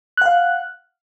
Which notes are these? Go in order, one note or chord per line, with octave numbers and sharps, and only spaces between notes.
F5 F#5 F#6